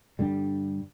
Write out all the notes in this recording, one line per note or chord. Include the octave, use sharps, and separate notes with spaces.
G2 D3 G3